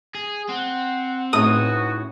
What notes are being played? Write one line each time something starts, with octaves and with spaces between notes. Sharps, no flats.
G#4
C4 F#5
C#2 A2 C#4 D#4 F#4 D#6